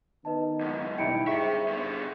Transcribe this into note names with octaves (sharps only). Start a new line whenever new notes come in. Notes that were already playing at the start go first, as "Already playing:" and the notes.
D#3 B3 D#4 B4 D#5 A5
C#2 F#2
B2 D3 G3 D#4 E4 G5 C#7 D7
G2 G#4 C5 E5 C#6
D3 B3